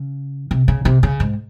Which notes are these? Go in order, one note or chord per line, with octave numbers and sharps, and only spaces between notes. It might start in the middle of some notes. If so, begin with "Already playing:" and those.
Already playing: C#3
C3
C#3
C3
C#3
G#2